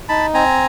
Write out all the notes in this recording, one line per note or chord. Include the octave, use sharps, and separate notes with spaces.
D#4 A5 B5
C4 G#5 A#5